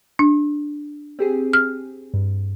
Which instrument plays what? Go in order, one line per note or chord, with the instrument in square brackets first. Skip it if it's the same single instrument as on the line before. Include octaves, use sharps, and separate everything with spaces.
[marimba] D4
[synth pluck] C4 G4 G#4
[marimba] F6
[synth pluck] G2